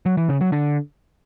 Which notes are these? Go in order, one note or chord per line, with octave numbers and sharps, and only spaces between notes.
F#3
E3
C#3
F#3
D3